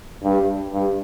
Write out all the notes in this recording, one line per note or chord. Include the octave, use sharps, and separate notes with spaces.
G2
G2